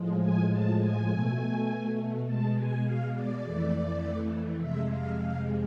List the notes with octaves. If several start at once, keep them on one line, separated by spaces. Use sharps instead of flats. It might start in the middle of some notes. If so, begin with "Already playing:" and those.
Already playing: A2 F3 G#3
G#5
A5
G#5
B2 A3
B2 G#3 A5
G#5
F5
D5
F2 E3 A3
F2 C3 G#3 E5
F5
F5